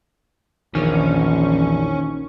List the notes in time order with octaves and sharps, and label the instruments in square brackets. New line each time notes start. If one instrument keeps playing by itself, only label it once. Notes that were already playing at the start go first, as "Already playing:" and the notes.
[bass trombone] A#1 [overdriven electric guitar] E2 [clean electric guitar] D#3 [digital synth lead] C#4